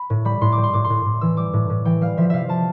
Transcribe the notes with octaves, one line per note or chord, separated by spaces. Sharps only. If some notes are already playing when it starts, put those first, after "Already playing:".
Already playing: B5
A2
G3 B5
A2 C6
D6
G3
C6
A2 D6
C6
A2
A2
E3 E6
G3 D6
A2
A2
E3 G5
G3 F5
F3 E5
C3 E5 F5
F3 A5